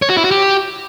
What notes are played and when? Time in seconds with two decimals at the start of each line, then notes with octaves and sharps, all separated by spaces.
0.02 C#5
0.09 F#4
0.17 E4
0.24 F#4
0.31 G4